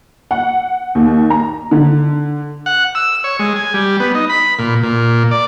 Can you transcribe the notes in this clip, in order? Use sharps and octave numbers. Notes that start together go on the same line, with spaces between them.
F#5
D#2
A#5
D3
F#5
E6
C#5
G#3
G#5
G3
B3
D#4
B5
A#2
A#2
D5